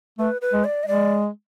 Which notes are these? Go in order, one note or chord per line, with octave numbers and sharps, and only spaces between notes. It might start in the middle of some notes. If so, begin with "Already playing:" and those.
A3 B4
B4
G#3
D5
D#5
G#3 D5